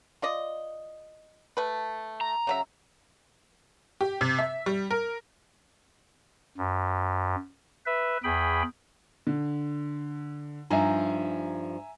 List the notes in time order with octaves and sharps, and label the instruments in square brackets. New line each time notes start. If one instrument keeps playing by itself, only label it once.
[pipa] F4 D5 D#5
A3 B4
[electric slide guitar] A#5
[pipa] C#3 F#3 E5
[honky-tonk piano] G4
C3
E5
G3
A#4
[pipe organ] F#2
B4 E5
E2 G#4 G5 B5
[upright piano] D3
[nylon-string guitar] G2 F3 D#4 [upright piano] E5 G#5 A#5